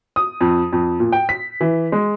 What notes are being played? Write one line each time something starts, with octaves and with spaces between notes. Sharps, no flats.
D#6
F2
F2
A#2
G5
B6
E3
G#3